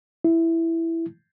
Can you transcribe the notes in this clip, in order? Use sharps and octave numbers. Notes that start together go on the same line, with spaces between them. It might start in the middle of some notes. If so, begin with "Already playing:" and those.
E4